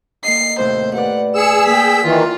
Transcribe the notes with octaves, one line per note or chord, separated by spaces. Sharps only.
A#3 D#5 C7
D#2 A2 C3 C5
G4 B4 D5 F#5
G#4 E6 C#7 E7
A#3 G5 B6
D#3 E3 F4